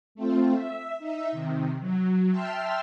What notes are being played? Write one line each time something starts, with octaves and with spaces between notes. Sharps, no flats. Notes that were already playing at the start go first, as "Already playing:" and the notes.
A3 C4 F4
E5
D#4 E5
C3 D#3
F#3
E5 G5 A5 C6 E6 F6